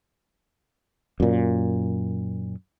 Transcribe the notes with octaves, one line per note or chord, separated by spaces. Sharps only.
F#2 A#2